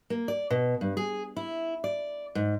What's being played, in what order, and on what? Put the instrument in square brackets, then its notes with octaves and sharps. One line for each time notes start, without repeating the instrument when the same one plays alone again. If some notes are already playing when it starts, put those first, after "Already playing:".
[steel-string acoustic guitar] A#3
D5
B2
G2
G#4
E4
D5
G#2